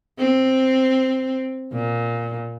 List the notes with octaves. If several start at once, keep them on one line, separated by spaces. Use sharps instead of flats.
C4
A#2